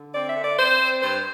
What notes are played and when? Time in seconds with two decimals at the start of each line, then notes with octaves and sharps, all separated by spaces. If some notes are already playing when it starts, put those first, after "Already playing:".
Already playing: D3
0.14 C4 D5
0.28 E5
0.35 D3
0.43 D5
0.58 C4 C5
0.81 C4
1.01 G2 C5